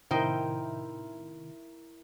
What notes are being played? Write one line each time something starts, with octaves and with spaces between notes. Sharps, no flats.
A2 C3 D#3 D#4 E4 A#4 C5 G5